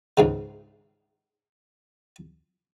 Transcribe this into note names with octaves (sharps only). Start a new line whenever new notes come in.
C#2 G#2 C#3